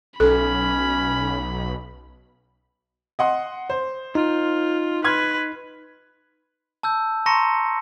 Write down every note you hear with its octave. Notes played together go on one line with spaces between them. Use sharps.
B1 C#4 A4 B5
D#5 F#5 C6
C5
D#4 F4
B4 C6 F6 G#6
A5 E6 G6
A5 A#5 C6 C#6 A#6 C#7